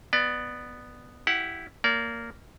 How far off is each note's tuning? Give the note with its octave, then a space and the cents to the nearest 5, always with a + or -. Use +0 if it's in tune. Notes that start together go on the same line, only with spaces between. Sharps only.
B3 +0 D5 +20
E4 +0 G4 -15 F#5 +0
A#3 -10 D5 -40